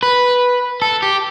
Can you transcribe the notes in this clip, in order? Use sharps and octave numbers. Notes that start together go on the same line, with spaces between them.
B4
A4
G4